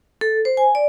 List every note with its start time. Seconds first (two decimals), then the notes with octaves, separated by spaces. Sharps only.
0.21 A4
0.45 C5
0.57 G#5
0.75 D5